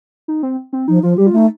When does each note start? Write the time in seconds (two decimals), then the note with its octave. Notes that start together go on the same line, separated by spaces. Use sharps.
0.28 D#4
0.43 C4
0.73 C4
0.88 F3 D#4
1.03 F3 F4
1.18 G3 G4
1.27 F4
1.32 A3 D#4